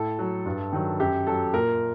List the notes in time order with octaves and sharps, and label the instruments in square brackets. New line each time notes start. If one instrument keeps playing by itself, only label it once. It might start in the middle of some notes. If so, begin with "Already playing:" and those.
Already playing: [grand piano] A2 A4
F#3
G2
D#3 F#3
F#2 G4
F#3 A4
A#2 A#4